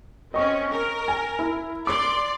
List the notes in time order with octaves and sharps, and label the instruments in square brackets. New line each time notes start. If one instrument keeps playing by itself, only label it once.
[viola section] C4 C#4 [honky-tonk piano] D#5 C#6
[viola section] A#4
[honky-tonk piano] G#5
E4
[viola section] D5 C6 [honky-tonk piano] D6